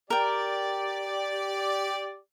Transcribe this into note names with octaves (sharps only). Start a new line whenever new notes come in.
G4 A#4 D5 G5